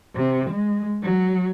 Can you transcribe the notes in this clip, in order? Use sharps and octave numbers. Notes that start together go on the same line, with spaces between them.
C3
G#3
F#3